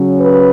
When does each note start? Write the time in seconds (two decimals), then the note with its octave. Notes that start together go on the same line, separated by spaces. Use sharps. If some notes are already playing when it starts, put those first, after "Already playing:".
Already playing: C#3 F#3 C#4
0.20 B4